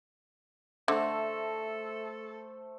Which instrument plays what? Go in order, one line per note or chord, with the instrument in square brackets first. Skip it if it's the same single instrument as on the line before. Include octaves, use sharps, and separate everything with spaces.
[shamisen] D3 [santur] A3 C5 [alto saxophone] A4 [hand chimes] E5